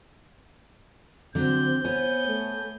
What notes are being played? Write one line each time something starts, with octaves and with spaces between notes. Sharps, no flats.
D3 F#3 C4 G6
B3 C5 C#5 G#5
A3